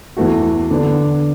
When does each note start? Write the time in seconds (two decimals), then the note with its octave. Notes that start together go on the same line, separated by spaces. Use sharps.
0.17 E2 E3 A3 F#4
0.71 D3 B3 D4